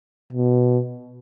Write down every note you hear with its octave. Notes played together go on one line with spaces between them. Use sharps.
B2